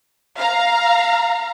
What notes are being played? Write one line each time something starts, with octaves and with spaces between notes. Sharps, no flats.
F5 A#5